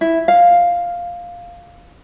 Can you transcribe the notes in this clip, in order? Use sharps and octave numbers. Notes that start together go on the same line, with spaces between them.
E4
F5